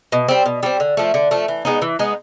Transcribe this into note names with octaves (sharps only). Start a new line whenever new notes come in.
B2
G3 C4
B2
G3 C4
D3
F3 A3
D3
F3 A3
E3
G#3 B3 D#4
E3
G#3 B3 D#4